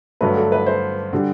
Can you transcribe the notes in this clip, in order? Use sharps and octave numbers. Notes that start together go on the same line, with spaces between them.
G2 D3 F#3 A3 B4
A4
B4
C5
D3 G3